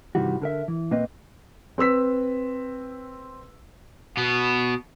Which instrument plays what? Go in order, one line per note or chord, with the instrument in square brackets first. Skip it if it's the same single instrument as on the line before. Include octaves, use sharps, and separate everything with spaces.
[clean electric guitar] G2 C3 D#3 E3 G3 F#4
D3 A#4 E5
E3
A#2 A#3 C4 B4 D#5
[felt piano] C4 B4 E6 B6
[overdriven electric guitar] B2 B3